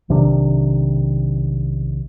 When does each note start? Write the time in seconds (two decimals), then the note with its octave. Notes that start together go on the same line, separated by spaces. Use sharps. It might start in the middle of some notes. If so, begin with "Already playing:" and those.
0.09 B1 C3 D#3 D4